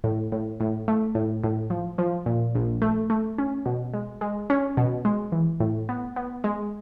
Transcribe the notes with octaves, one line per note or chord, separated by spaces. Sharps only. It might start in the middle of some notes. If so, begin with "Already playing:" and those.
A2
A2
A2
A3
A2
A2
F3
F3
A#2
A#1
A3
A3
C#4
B2
G#3
G#3
C#4
B2
G#3
E3
A2
B3
B3
G#3